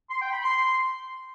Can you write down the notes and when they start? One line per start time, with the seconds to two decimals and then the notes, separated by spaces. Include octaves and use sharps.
0.10 C6
0.21 G5
0.32 B5
0.43 C6